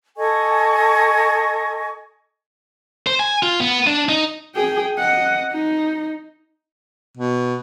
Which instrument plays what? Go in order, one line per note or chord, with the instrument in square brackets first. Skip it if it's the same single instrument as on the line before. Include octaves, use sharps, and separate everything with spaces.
[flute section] A4 D#5 G#5 C#6
[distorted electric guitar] C5
G#5
F4
B3
D4
D#4
[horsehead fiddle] G#4 G5
D#5 F#5
D#4
[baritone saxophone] B2